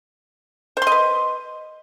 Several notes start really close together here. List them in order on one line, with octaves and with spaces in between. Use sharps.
C5 C6 D#5 B4